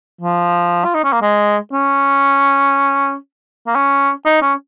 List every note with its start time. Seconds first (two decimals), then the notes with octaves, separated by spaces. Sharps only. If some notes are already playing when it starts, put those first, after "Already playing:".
0.21 F3
0.85 F4
0.94 D#4
1.04 C#4
1.13 A#3
1.22 G#3
1.73 C#4
3.67 A#3
3.75 C#4
4.25 D#4
4.42 C#4